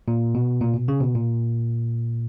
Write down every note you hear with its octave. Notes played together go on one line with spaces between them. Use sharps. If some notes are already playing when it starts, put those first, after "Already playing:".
A#2
B2
A#2
B2
C#3
B2
A#2